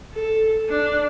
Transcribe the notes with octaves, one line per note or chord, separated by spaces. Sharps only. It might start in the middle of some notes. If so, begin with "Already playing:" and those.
A4
D4